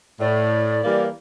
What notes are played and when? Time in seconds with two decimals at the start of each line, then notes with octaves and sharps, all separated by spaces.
0.20 A2 D5
0.84 E3 G3 A#3